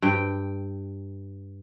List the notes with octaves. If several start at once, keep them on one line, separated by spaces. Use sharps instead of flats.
G2 G5